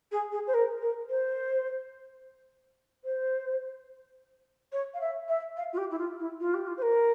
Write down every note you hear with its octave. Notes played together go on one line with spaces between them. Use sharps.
G#4
G#4
C5
A#4
A#4
C5
C5
C#5
F5
E5
E5
F5
F4
G4
E4
F4
E4
F4
G4
F4
C5
A#4